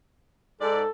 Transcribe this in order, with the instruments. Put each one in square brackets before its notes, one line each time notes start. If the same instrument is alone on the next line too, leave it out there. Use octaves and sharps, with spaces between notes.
[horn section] G#2 D5 [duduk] A4